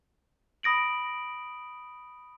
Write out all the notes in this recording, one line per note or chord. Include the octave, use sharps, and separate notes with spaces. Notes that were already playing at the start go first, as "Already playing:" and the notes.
B5 D#6 A#6 D7 F#7